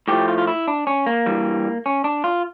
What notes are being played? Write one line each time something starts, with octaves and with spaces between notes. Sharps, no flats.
A2 F3 A3 G4
F4
F4
E4
D4
C#4
A#3
G2 E3 G3
C#4
D4
F4